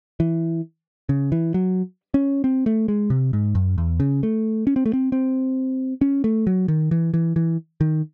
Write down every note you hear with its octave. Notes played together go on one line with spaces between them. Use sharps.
E3
C#3
E3
F#3
C#4
C4
A3
G#3
C3
G#2
F#2
E2
C#3
A3
C#4
C4
A3
C4
C4
C#4
A3
F#3
D#3
E3
E3
E3
D#3